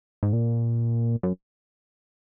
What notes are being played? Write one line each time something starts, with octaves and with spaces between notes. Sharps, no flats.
G#2
A#2
F#2